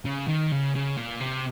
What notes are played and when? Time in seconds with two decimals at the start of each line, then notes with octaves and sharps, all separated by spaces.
0.05 C#3
0.28 D#3
0.52 C#3
0.75 C#3
0.97 A#2
1.20 C3